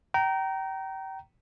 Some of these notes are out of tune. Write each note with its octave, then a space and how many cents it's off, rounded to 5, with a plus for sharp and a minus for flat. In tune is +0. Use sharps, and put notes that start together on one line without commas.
G5 -30 A#5 +0